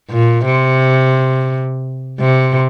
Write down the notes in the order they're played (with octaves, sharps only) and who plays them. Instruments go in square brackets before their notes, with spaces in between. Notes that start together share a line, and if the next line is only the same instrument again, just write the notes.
[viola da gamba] A#2
C3
C3